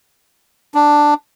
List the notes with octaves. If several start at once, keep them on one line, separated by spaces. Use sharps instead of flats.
D4